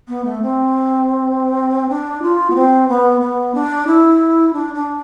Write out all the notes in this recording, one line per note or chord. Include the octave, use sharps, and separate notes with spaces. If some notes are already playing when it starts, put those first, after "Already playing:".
B3
A3
C4
D4
F4
B3
C4
B3
B3
D4
E4
D4
D4